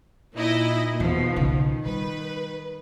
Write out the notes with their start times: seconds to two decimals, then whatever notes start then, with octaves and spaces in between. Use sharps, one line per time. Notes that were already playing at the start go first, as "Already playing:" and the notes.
0.35 A#2 D#4 E4 D#5
1.00 E2 B2 D#3 F3
1.36 B1 C#3
1.85 G3 B4